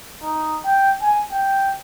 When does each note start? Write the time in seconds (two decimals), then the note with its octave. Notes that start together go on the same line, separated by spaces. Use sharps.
0.23 D#4
0.65 G5
1.02 G#5
1.32 G5